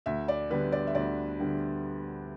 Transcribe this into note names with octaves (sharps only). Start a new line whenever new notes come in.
D2 E5
D5
D3 G3 B3 D4 B4
D5
E5
D2 D5
D3 G3 B3 D4